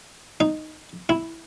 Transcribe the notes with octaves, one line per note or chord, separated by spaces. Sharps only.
D#4
E4